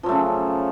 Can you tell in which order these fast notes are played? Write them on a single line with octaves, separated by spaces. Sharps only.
F3 F#3 A3 C#3